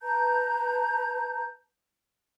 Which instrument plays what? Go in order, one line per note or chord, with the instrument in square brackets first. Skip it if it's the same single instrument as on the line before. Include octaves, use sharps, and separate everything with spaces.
[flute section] B4 A5 A#5 G6